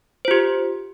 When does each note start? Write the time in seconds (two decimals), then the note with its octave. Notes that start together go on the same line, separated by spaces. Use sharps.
0.25 C5
0.28 F4
0.31 G4